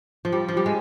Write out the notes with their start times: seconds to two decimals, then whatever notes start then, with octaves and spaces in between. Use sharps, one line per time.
0.25 F3
0.32 G3
0.48 F3
0.57 G3
0.66 G#3